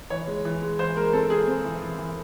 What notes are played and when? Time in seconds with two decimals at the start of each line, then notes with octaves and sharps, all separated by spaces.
0.10 E3 C#5
0.27 G#3
0.45 E3
0.62 G#3
0.79 E3 C5
0.96 G#3 A#4
1.13 C4 A4
1.30 G#3 G#4
1.47 C4
1.64 E3
1.82 E3
1.98 E3